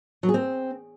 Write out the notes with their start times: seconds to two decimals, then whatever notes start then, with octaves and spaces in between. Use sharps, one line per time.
0.23 F#3
0.29 G#4
0.34 C4